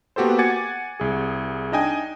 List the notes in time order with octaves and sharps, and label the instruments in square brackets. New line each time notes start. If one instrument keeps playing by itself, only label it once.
[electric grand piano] A#3 B3 F#4 G4 A4 C5
F#5 G#5 D6 G#6 A6 C#7
C2 G#4
D4 D#4 D#5 G5 G#5